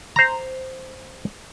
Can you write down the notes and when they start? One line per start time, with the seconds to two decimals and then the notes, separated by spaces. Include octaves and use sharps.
0.16 C5 A#5